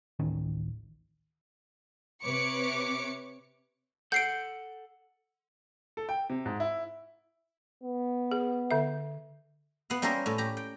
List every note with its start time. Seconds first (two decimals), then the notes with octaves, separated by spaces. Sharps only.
0.19 D1 A1 D#3 C#4
2.22 C3 B4 C#5 D6 C#7
4.12 A4 F#5 G6 C7 D7
5.97 A4
6.09 G5
6.30 C3
6.46 G#2
6.60 E4
7.83 B3
8.31 G#4
8.71 D3 E5
9.90 B3 F5
10.02 G3 A#3 C#4 E4 A#4 C5
10.26 A2 C#4
10.38 G4 A#5
10.57 G5